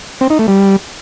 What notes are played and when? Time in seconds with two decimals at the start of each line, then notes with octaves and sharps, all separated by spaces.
0.21 C4
0.30 D#4
0.39 A3
0.48 G3